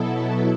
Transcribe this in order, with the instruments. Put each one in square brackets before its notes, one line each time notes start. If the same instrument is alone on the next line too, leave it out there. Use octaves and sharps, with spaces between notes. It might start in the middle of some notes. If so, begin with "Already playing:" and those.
Already playing: [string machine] B2 F#3 B3 E4 A4